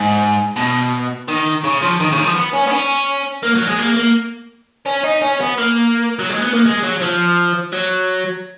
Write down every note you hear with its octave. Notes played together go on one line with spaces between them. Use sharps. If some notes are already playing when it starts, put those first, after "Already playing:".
Already playing: G#2
B2
D#3
C#3
F3
D#3
C#3
D#3
F3
B3
C#4
B3
C#4
A#3
F#3
G#3
A#3
A#3
C#4
D#4
C#4
B3
A#3
F#3
G#3
B3
A#3
G#3
F#3
F3
F#3